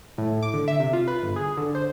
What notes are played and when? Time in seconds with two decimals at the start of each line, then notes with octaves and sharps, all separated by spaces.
0.18 A2
0.42 D6
0.54 D3
0.68 E5
0.80 C3
0.93 F4
1.08 B4
1.23 G1
1.36 G#4
1.57 D3
1.75 C5